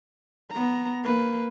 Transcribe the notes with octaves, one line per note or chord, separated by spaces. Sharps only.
B3 A#5
A#3 B4